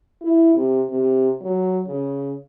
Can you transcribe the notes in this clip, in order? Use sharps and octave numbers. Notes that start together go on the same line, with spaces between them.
E4
C3
C3
F#3
C#3